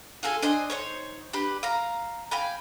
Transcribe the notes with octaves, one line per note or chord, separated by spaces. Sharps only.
F4 G#4 A4 G#5
D4 C5 D#5 G#5
D#4 C5 C#5
D4 G4 B4
F5 A#5
F5 G5 G#5 B5